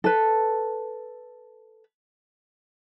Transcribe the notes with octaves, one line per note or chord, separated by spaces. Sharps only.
A4 B4